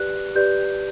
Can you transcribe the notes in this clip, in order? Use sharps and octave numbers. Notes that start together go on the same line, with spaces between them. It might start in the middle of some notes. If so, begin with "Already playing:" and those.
Already playing: G4 B4 D5 F#6
G4 B4 D5 G6